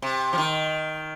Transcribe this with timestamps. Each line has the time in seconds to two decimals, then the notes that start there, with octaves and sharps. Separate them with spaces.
0.02 C3
0.33 F3
0.38 D#3